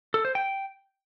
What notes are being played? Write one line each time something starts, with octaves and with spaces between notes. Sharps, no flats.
A4
C5
G5